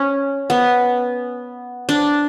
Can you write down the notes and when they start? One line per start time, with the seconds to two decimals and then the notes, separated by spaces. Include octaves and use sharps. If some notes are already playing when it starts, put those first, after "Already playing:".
Already playing: C#4
0.50 B3
1.89 D4